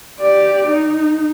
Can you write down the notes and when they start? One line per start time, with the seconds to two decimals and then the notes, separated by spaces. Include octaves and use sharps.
0.19 G4 D5
0.67 D#4